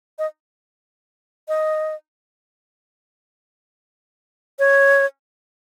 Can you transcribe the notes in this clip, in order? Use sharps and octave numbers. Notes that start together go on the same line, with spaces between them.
D#5
D#5
C#5